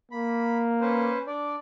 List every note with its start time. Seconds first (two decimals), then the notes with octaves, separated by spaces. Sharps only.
0.12 A#3 B5
0.81 C#4 B4 C5
1.27 D4 D5